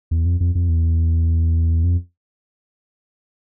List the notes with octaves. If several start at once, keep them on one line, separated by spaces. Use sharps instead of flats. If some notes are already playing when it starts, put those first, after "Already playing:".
E2
F2
F2
F2
E2
F2